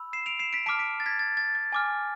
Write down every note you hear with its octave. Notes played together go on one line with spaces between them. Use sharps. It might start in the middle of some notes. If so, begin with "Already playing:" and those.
Already playing: B5 E6
C7 E7
D7 F7
C7 E7
B6 D7
A5 D6 F6 B6 D7
B6 D7
A6
G#6 B6
A6
A6
A6
G#5 D6 F6